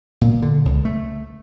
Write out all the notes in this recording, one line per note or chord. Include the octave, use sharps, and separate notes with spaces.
A#2
D3
C#2
A3